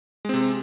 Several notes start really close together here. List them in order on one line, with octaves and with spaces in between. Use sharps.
G#3 C4 C3